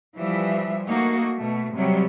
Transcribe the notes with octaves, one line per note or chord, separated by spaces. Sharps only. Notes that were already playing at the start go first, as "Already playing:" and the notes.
E3 F3 G3 E5
A3 A#3 D#4 F#4
B2 A3
C3 F#3 G3